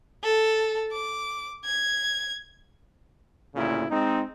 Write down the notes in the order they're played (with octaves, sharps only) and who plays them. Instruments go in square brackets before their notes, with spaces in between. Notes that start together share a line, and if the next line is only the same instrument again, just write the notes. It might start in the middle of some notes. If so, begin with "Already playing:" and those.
[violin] A4
D6
G#6
[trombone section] D2 A#2 C#3 E4
G#3 C4 D#4